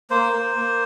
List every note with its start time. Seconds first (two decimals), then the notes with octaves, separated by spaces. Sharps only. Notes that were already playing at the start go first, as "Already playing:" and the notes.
0.10 A#3 C5
0.33 A#3
0.56 A#3